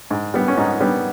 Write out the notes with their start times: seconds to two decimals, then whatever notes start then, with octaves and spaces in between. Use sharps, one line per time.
0.11 G#2
0.34 G3 B3
0.48 C#4
0.57 G#2 D#4
0.81 G3 B3